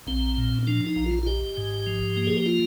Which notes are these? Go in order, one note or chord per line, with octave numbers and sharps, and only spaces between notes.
A#1 C4
A#2
C4
F3 D4
D#4
A#1
F4
F4
G#1 G4
G#2
F3
A#3
G#4
G4
F4